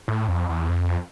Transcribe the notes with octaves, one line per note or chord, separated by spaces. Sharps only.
A2
F2
E2
F2